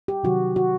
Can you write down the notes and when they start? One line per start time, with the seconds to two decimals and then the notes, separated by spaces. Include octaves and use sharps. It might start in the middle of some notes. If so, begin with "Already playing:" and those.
0.08 G4
0.23 C3 D#3 F#3 F#4
0.56 F#4